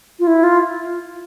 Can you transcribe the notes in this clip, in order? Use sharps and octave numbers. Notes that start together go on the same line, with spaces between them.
F4
E4
F4